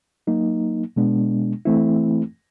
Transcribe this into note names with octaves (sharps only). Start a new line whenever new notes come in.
F#3 A#3 D#4
B2 G#3 B3 D4
E3 A3 C4 E4